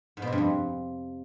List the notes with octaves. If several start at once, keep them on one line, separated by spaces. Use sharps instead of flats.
G#2
B2
C3
G2
F2